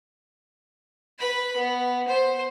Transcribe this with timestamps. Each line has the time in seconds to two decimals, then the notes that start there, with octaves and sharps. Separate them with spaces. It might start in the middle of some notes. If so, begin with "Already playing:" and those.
1.19 B4 B5
1.56 B3
2.08 C5